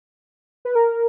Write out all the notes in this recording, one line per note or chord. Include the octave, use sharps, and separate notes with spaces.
B4
A#4